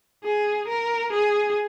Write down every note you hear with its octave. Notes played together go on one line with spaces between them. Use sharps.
G#4
A#4
G#4